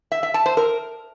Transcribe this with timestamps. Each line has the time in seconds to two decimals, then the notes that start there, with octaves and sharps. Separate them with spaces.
0.12 E5
0.23 E5
0.34 A5
0.46 C5
0.57 A#4